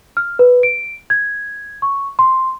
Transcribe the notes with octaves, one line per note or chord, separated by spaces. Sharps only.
F6
B4
D7
G#6
C#6
C6